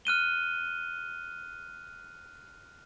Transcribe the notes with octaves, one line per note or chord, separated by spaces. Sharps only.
F6 F#6 D#7 G7